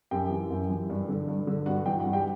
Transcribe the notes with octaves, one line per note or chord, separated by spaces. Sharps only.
F#2 G4 G5
E3
F#2
E3
G2
D3
G2
D3
G2 F#4 F#5
E3 G5
F#5
G2
G4 G5